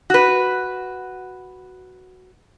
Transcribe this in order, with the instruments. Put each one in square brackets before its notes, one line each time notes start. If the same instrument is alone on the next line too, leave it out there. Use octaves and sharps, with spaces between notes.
[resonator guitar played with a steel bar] F#4 B4